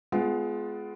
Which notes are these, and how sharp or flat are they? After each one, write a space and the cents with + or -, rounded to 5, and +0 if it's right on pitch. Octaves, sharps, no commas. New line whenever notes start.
G#3 +20 B3 +25 F4 +0